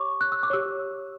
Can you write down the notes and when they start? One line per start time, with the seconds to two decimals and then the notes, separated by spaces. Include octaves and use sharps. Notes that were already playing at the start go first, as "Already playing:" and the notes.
Already playing: G4 C#5 C#6 D6
0.21 F#6
0.32 E6
0.43 D6
0.50 G4 C#5 E6